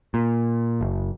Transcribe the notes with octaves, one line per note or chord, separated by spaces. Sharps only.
A#2
F#1